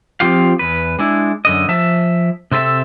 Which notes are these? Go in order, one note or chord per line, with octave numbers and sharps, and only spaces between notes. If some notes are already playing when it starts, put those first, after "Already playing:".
F3 C4 F4 G4 F5
E2 B4
G#3 D4 E4
F#2 D3 D#5
F3 E5 A5
C3 C4 A4 B4 E5